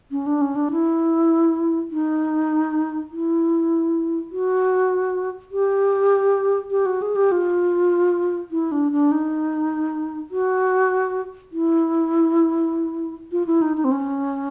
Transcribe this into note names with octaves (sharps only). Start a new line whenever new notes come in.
C#4
D4
C#4
D4
E4
D#4
E4
F#4
G4
G4
F#4
G#4
G4
F4
E4
D4
D4
D#4
F#4
E4
F4
E4
D#4
D#4
C4
C#4